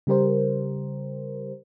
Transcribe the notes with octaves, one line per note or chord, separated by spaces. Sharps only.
C#3 G3 G4 A#4 C5